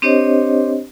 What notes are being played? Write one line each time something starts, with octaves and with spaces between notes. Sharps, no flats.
C4 D4 G4 C5 C#5 D#5